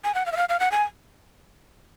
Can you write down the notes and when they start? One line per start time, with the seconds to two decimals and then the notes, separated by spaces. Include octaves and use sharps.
0.04 G#5
0.15 F#5
0.26 F5
0.32 E5
0.37 F5
0.49 F5
0.60 F#5
0.71 G#5